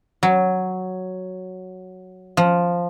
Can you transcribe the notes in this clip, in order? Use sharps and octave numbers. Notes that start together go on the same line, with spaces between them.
F#3
F3